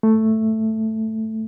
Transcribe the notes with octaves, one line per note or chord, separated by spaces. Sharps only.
A3